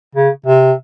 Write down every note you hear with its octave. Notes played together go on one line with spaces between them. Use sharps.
C#3
C3